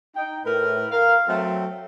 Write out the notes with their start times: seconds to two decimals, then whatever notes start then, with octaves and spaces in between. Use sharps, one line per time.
0.16 D#4 G5
0.45 A2 A#4 B4
0.91 A#4 F5
1.28 F#3 A3 C4